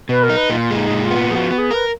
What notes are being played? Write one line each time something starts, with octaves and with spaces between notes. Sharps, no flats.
B2 B4
A#4
D#4
B4
A#2 F4
G#3
D#4
A#2
F4
B3
F3 F#4 G#4
B3
G#4
A#4 B4